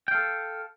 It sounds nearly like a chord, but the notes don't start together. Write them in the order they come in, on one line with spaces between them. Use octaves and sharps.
G5 F5 A4